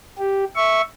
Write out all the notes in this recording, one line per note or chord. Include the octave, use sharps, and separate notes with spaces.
G4
E5 C#6